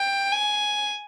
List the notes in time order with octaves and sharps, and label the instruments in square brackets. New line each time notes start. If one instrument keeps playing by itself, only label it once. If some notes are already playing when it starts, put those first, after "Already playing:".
Already playing: [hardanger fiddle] G5
G#5